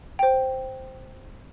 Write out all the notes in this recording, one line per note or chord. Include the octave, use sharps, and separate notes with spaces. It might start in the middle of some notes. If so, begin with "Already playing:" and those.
C5 G5